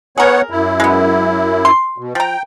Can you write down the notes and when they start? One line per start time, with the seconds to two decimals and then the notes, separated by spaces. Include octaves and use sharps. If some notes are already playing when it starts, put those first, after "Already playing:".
0.18 B3 G#4 A#4 C#5 F#5
0.50 F#2 E4
0.80 G#3 B3
1.65 C6
1.98 B2
2.15 F3 G5 A#5